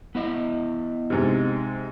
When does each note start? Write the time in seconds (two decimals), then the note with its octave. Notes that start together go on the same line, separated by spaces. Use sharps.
0.15 B3 E4 D#5
1.10 G#2 C3